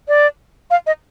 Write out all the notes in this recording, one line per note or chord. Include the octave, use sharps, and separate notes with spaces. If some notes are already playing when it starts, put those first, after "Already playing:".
D5
F5
D#5